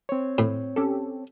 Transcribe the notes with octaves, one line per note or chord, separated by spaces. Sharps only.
C4 C#5
A2
C#4 G4 A4